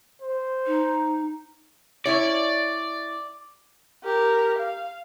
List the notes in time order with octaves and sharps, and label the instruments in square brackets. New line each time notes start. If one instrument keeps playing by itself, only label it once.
[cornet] C5
[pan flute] D#4
[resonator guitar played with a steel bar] C#4 E4 C#5 [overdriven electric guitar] D5
[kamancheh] G4 A#4
F5